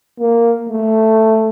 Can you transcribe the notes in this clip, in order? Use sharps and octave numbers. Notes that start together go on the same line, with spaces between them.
A#3
A3